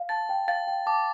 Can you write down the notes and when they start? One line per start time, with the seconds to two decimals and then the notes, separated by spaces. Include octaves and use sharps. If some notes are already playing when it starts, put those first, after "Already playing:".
Already playing: F5
0.09 A5 A6
0.29 G5
0.48 F5 A6
0.67 G5
0.86 A5 D6